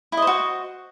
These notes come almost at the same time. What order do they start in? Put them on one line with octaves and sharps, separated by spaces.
E4 D#5 C5 F#4